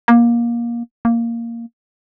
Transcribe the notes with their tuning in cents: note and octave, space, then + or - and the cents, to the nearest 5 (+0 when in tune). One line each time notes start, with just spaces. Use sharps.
A#3 +20
A#3 -5